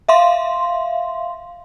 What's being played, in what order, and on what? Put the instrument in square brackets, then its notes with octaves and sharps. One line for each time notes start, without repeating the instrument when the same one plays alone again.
[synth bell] E5 F5 C6